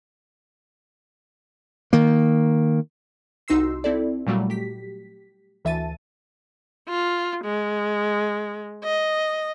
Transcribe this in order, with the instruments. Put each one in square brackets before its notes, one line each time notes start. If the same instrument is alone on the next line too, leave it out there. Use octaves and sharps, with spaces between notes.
[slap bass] D#3 A#3
[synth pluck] C2 D#4 F#4 C6 E6 C7
C4 E4 A4 D5
A#2 F#3 G3 A3 F#4
G4 B6
D2 E3 E5 A5 A6 D#7
[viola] F4
G#3
D#5